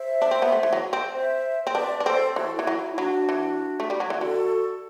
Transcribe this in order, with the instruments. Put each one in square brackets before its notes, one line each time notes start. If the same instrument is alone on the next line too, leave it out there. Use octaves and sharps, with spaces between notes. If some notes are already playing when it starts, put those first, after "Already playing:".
Already playing: [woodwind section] C5 E5
[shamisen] D4
C4
B3
A3
E3
F#3
C4
[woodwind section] C5 E5
[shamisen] C4
[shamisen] D4 [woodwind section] B4 D5
[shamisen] D4
[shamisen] C4 [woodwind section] A4 C5
[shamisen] E3 [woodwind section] F#4 A4
[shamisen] E3 [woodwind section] E4
[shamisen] F#3
[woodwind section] E4
E4
[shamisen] F#3 [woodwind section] D4 F#4
[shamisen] E3
A3
G3
F#3
E3
[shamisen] D3 [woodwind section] F#4 A4